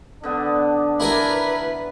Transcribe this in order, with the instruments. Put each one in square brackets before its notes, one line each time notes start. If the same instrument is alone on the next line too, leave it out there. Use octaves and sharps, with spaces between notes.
[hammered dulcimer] D3 B3 [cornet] D4
[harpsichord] E4 A#4 G#5 [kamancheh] B4